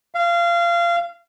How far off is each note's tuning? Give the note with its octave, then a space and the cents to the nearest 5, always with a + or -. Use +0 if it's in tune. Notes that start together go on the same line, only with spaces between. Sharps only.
F5 -25